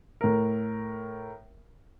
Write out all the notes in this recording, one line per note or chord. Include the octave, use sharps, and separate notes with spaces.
A2 A#4